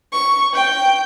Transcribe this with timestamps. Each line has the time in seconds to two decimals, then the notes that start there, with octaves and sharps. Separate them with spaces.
0.12 C#6
0.54 G5 G6